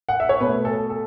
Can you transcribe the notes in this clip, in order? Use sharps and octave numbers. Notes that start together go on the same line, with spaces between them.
F#5
E5
C#5
B2 A3 B4
A4
A4